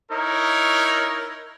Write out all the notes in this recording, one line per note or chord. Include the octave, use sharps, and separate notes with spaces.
D#4 E4 A#4 C#5